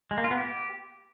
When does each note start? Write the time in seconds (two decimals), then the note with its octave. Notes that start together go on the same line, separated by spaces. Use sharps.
0.11 G#3
0.18 A#3
0.24 F4
0.31 B3
0.37 G4